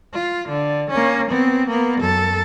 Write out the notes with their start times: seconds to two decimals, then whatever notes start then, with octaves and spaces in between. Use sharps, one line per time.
0.13 F4
0.48 D3
0.91 A#3 C#4
1.30 B3 C4
1.69 A#3 B3
2.01 F#2 A4